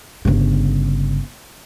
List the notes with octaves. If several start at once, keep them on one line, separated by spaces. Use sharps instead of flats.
G1 C#3